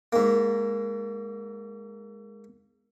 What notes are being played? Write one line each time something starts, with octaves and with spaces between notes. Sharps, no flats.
G#2 A#3